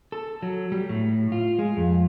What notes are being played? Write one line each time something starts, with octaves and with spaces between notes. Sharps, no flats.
A4
F#3
G3
A2
F4
G#3
F2